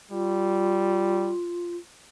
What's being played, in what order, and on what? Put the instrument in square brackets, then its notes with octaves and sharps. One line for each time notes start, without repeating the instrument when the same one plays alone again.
[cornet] G3 [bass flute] F4